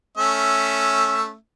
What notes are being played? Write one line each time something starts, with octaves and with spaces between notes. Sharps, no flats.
A3 C#4 E5